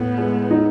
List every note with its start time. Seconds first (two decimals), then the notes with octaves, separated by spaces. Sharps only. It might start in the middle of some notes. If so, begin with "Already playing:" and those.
Already playing: A2 B3
0.18 G#3
0.51 D#4